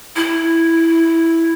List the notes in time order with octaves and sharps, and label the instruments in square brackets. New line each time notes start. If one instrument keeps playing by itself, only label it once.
[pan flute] E4